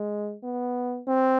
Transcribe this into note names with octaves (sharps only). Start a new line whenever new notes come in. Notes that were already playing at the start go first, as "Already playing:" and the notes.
Already playing: G#3
B3
C4